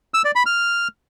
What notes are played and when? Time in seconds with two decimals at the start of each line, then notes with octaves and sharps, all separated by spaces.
0.14 E6
0.25 D5
0.35 B5
0.46 F6